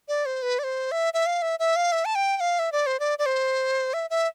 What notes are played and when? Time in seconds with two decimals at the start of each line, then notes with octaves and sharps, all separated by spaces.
0.08 D5
0.26 C5
0.42 B4
0.59 D5
0.64 C5
0.92 E5
1.14 E5
1.26 F5
1.42 E5
1.59 E5
1.76 F5
1.92 E5
2.05 A5
2.15 G5
2.37 G5
2.40 F5
2.59 E5
2.72 D5
2.86 C5
3.00 D5
3.19 D5
3.26 C5
3.94 E5
4.10 E5